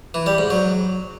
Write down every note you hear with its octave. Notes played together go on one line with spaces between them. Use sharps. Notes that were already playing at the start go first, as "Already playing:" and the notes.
E3
G3
G#2
F#3